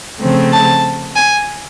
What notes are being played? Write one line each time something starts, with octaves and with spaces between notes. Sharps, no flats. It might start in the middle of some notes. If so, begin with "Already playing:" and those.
C#3 F3 A3 C4
A5
G#5